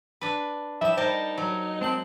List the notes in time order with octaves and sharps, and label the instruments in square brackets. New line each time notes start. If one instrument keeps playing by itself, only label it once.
[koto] D4 B4
[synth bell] F3 E7 [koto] G3 [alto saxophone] E5
[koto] G3 A#4 A5 [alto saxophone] D#4 [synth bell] C5 D#5
[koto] F#3
[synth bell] G#3 A5 F#7 [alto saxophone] C4